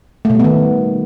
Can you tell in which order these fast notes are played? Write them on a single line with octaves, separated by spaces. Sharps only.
A3 B2 G3 B3 D#3